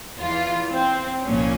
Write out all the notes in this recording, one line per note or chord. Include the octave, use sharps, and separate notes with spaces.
E2 E3 F4
C4
C2 A#2 F3 C#4